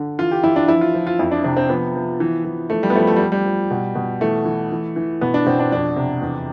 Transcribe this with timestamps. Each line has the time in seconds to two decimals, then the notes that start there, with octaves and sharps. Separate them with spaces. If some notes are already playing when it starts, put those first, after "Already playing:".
Already playing: D3
0.19 E3 F4
0.31 G4
0.43 E3 E4
0.56 D4
0.68 F3 E4
0.81 F4
0.94 F3
1.07 F4
1.19 F2 E4
1.31 D4
1.44 C3 D4
1.57 C4
1.69 F3 B3
1.95 F3
2.20 E3
2.45 E3
2.70 F3 A3
2.83 G3
2.90 B3
2.95 F3 A3
3.07 A3
3.16 G3
3.20 F3
3.32 G3
3.46 F3
3.71 B2
3.95 B2
4.21 E3 A3
4.45 E3
4.72 E3
4.96 E3
5.21 B2 B3
5.34 D4
5.46 B2 C4
5.59 D4
5.72 F2 D4
5.96 C3
6.22 E2